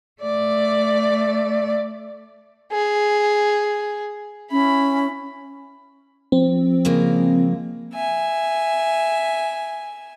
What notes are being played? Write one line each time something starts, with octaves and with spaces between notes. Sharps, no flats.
A3 D5
G#4
C#4 E4 B5
F3 C4
C#3 G#3 A#3
E5 G#5